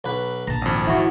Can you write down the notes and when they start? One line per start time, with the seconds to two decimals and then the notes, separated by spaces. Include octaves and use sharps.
0.04 B1 B4
0.47 A#1 A5 A#5
0.62 G#1 F2
0.87 E3 E4 F#4